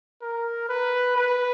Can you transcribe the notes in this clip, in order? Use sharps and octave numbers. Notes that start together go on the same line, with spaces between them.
A#4
B4
B4